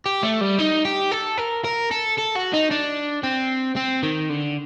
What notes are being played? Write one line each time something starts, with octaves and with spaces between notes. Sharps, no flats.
G4
A3
G3
D#4
G4
A4
A#4
A#4
A4
A4
F#4
D#4
D4
C4
C4
D#3
D3